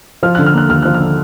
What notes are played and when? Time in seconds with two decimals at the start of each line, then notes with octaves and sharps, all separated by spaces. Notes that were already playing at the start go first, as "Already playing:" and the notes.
0.23 F3 F6
0.35 D3 F#6
0.46 F6
0.54 A#3 F#6
0.69 D#2 F6
0.83 F3 F#6
0.94 F6
1.00 D3